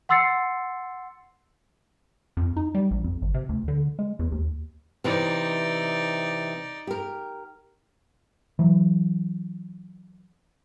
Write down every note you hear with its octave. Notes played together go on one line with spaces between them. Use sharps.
F#5 C6 E6 A6 C7 C#7
F2
D#4
G3
A#1
F2
G#1
C3
D2
D3
G#3
E2
D#2
C3 E3 D#4 D5
G4 A#4
E3 F#3